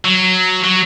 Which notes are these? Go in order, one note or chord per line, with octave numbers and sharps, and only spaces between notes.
F#3
F#3